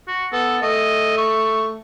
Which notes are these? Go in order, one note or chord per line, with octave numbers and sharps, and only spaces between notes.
F#4
B3 A4
A3 D#5
C#6